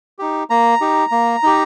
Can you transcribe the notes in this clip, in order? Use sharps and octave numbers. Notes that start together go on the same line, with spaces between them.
D#4 G4
A#3 A#5
D#4 G4
A#3
D#4 G4